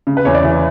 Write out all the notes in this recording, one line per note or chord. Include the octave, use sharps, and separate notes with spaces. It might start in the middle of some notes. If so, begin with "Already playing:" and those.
C#3
B4
E2 C#5
D5
E3